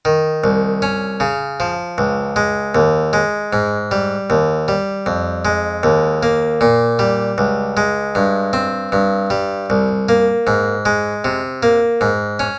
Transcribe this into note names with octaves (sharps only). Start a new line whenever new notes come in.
D#3
C2
C#4
C#3
F3
C#2
G#3
D#2
G#3
G#2
G3
D#2
G3
F2
G#3
D#2
A#3
A#2
G3
C#2
G#3
G2
C4
G2
G3
C2
A#3
G#2
G#3
C3
A#3
G#2
C#4